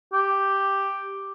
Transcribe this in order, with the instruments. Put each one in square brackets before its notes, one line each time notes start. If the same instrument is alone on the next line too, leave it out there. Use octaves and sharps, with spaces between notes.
[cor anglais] G4